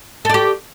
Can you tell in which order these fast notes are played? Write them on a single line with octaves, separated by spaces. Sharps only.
A4 D5 G4